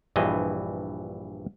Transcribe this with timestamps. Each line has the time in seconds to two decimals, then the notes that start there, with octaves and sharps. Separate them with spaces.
0.16 A#1 G2 E3 C5 D#5